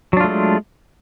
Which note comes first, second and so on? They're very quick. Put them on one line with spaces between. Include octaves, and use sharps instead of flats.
F#3 D4 F4 A3 G#3